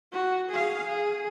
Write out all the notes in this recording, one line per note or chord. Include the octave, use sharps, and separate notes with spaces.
F#4
G#4 F5
G#4